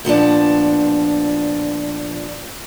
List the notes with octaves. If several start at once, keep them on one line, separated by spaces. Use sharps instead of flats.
A#2 F3 B3 D4